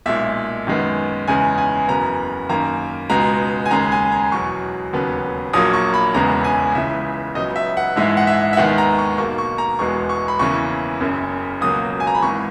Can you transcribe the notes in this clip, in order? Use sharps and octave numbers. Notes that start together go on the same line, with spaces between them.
B1 A#2 G#3 E5
F#2 D#3 G#3 B3
E2 C#3 G#3 B3 G#5
G#5
F#1 E2 C#3 F#3 B3 A#5
F#2 D#3 A#3 A#5
C#2 B2 G#3 B3 A#5
G#5
D#2 C#3 G#3 A#5
G#5
A#5
E2 B2 F#3 C#6
E1 D#2 C#3 F#3 B3
A#1 A#2 F#3 A#3 D#6
C#6
B5
E1 E2 C#3 G#3 B3 A#5
G#5
C#2 C#3 E3 G#3 E5
C#2 C#3 F#3 B3 D#5
E5
F#5
A#1 G#2 E3 G#3 E5
F#5
E5
E5
D#2 D#3 G#3 B3 F#5
A#5
C#6
B1 B2 A#3 C#6
C#6
A#5
E1 E2 B2 G#3 B3 C#6
C#6
B5
E2 C#3 E3 A#3 C#6
F#1 F#2 C#3
C#2 B2 F#3 A#3 D#6
G#5
A#5
B5
G#1 G#2 E3 C#6